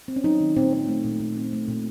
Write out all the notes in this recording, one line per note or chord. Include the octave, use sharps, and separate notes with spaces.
C4
C#4
F#3 D#4
D#3
A#2 C4
C4
A3
A#2
A#2
C4
A3
A#2